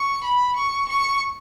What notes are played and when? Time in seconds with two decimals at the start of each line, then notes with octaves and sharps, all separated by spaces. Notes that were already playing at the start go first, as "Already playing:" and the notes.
Already playing: C#6
0.24 B5
0.56 C#6
0.89 C#6